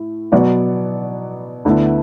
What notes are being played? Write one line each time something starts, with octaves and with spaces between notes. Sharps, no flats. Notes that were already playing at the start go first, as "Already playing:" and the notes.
Already playing: A2 E4
B2 F#3 B3 F#4 D5
D2 D3 B3 E4